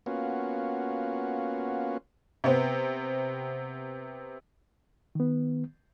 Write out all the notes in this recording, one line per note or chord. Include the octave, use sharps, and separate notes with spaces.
A#3 B3 C#4 F4 F#4
C3 B3 C4
D#3 B3